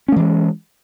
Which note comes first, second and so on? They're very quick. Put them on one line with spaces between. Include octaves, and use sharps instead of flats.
C#4 A3 E3 G#3